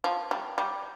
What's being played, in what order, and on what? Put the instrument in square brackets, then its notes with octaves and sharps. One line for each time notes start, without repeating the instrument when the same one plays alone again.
[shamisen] F3
G3
G3